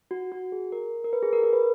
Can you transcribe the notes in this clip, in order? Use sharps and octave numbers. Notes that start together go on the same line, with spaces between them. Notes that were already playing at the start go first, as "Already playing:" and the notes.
F#4
F#4
G#4
A#4
A#4
B4
G#4
A#4
A#4
B4